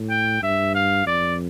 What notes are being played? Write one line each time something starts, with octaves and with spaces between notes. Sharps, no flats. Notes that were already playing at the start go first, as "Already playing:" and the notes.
Already playing: A2
G5
G2 E5
F5
F2 D5